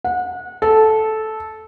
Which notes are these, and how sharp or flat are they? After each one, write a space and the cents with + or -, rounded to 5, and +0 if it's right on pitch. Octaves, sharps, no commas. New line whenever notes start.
F#5 -30
A4 -10